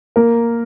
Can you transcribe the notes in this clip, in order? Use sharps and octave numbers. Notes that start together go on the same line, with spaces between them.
A#3 A#4